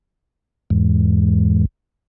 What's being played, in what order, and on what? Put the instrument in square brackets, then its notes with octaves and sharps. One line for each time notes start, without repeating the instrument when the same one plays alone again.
[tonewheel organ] E2 G#2